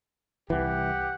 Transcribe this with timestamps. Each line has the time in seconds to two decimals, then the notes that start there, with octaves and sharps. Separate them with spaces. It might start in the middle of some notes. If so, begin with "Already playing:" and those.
0.50 C2 E3 G4 F#5